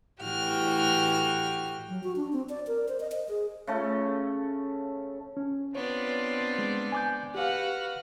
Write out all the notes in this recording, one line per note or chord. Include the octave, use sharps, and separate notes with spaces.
A2 E3 F#4 G4 F6
F#3
F#4
D4
C4
D5
A#4
C5
D#5
D#5
G#4
C#3 A3 A4
C#4
B3 C4 D4 F4 C#5 D5
G#3
G#5 D6 G6
F#4 G4 B4 F5 F#5 F6